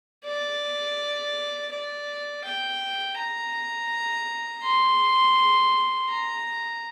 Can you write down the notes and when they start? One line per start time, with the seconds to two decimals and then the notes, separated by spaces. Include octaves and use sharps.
0.25 D5
1.72 D5
2.44 G5
3.18 A#5
4.63 C6
6.09 A#5